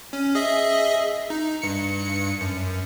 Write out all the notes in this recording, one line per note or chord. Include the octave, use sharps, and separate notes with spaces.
C#4
G#4 D#5 E5
D#4
G2 C#7
F#2